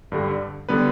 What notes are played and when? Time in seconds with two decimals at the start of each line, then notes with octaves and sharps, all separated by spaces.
0.12 G2 D3 G3
0.69 D3 G3 B3 B4